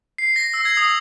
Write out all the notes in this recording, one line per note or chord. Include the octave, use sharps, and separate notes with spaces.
C7
A#6
E6
G#6
D#6